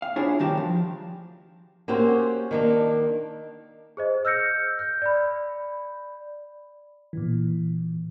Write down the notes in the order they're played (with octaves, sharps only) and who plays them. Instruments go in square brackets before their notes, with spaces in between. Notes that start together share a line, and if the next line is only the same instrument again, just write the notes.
[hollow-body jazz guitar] F5
D4 E4 F4 G#4 C5 C#5
D2 G2 D#3 F#4 G4 A5
F3
[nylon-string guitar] A#3 C4 C#4 F#4 G4 C5
D#3 A#3 D4
[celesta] G#4 C5 D#5
E6 F6 G6 A#6 C#7
G6
D5 B5
[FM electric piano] A#2 E3